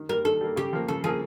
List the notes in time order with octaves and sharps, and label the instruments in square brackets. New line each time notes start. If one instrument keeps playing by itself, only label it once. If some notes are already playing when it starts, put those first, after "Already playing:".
Already playing: [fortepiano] D#3
[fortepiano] G3 A#3 [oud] A#4
[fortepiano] D#3 [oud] A4
[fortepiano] G3 A#3
[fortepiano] C#3 [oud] G4
[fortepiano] F3 A#3
[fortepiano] C#3 [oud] A4
[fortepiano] F3 A#3 [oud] G#4